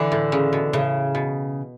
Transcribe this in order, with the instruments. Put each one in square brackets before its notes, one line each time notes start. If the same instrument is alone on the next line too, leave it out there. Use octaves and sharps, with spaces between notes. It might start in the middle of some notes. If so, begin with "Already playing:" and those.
Already playing: [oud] D3 [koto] E3
[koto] A2
C#3
B2
[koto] A2 [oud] C#3
[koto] B2